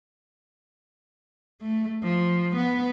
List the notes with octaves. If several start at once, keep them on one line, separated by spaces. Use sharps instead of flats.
A3
F3
B3